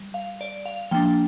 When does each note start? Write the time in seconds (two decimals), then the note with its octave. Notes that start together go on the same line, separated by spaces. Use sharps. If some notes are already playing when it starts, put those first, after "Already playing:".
Already playing: G3
0.14 F5
0.41 D5
0.66 F5
0.91 F3 A#3 D4 G5